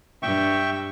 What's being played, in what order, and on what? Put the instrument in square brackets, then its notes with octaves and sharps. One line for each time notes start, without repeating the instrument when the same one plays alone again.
[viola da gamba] G2 [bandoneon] E5 G5 C#6